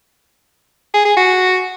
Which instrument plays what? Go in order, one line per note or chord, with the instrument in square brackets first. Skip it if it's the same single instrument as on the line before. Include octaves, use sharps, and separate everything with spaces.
[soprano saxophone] G#4
G#4
F#4